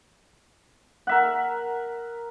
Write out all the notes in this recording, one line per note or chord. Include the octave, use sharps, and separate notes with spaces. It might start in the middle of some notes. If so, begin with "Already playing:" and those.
A#4 E5 F#5